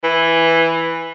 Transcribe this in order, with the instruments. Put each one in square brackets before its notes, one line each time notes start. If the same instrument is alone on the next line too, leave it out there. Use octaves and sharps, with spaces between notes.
[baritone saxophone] E3